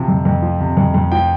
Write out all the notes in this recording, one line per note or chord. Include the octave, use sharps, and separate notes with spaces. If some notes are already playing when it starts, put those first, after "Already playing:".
Already playing: C3 F3
F2
F2
F3
C3
F2
F2
F3 G5